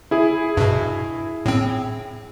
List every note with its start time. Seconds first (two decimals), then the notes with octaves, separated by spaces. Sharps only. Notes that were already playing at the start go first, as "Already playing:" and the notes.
0.11 E4 G#4
0.57 G2 B2
1.46 A2 C4